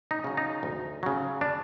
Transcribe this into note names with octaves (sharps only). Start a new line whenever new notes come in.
D#4
C#3 F#3
D#4
D2
C#3 F#3
D4